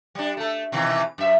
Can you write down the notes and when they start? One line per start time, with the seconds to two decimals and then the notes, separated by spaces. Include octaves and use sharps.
0.15 G3 D4
0.37 A3 A4
0.72 B2 D#3 E3
1.18 F#2 E5